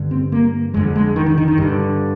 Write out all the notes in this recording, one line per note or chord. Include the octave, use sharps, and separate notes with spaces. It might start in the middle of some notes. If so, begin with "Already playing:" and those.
Already playing: G2 D3
C4
A#3
F2 D3 G#3
G#3
D#3
D#3
D#3
D#3
G2 D3